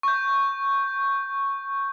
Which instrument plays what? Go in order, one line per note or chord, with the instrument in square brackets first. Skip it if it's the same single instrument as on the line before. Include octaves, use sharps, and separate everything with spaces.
[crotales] C#6 G6